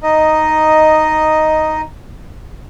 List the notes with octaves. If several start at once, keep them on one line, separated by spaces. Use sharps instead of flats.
D#4 D#5